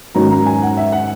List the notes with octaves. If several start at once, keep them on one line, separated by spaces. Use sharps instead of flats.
G#2 D#3 F#3 C#4 A#5
A#5
G#5
F#5
E5
F#5